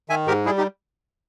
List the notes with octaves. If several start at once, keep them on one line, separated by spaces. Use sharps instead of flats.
D#3 E5 G#5
G#2 G4 A#4
G3 E4 G#4
D#4 G4